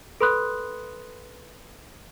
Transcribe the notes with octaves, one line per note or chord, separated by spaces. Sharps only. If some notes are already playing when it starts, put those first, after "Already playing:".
A4 B4 B5 C6 D#6 F#6